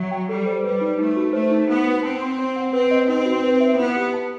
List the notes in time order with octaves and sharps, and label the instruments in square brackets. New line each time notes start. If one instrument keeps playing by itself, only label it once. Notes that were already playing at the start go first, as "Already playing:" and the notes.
Already playing: [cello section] F#3 [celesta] E5
[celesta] G5
[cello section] G3 [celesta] A4
[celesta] C5
[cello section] G3 [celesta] B4
[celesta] D#4
[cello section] A3 [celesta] D#4
[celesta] F#4
[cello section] A3 [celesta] C5
[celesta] D#4
[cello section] B3 [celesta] D#4
[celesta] F#4
[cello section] C4 [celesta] A5
[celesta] C6
C5
F#5
[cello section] C4 [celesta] B4
[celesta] D#5
[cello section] C4 [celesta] D#4
[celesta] F#4
B4
E5
[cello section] B3 [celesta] E4
[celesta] G4
A5